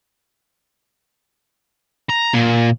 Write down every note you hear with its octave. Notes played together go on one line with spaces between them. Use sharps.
A#5
A#2